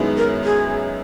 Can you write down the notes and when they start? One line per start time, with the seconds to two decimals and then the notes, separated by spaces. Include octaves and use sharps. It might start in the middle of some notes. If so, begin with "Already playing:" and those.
Already playing: F#2 D#3 G#3 B3 E4
0.17 A#4
0.44 G#4